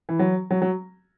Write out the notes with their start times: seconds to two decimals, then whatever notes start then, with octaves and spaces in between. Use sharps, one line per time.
0.09 E3
0.19 F#3
0.51 F#3
0.62 F#3